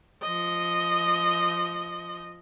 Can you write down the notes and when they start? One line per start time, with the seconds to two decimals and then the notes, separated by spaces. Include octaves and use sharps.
0.22 F3 D#5